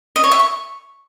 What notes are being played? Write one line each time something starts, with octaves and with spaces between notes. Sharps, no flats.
D#5
C#5
E5
C#6